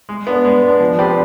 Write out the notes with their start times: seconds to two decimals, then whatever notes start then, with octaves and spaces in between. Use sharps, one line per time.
0.09 G#3
0.27 B3 D4
0.45 G#3
0.63 B3 D4
0.80 F3
0.99 C4 G4 B4 D5